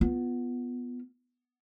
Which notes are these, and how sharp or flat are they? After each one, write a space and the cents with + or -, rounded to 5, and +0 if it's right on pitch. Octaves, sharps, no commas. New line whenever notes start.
B3 +0 F4 +0